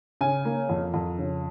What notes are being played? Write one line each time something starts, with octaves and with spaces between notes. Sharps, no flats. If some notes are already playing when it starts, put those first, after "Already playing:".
C#3 G#5
A#3
F2
F2
C#3